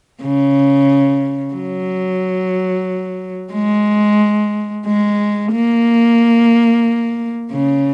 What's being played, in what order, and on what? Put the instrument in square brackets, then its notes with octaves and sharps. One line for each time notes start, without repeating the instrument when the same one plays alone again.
[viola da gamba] C#3
F#3
G#3
G#3
A#3
C#3